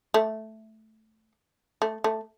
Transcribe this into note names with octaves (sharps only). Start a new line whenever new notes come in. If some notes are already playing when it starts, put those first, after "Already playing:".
A3
A3
A3